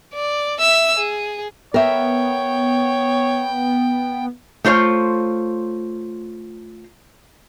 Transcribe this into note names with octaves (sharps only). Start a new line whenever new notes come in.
D5
E5 E6
G#4
B3 A#4 C#5 E5 G5
A3 F4 C5 C#5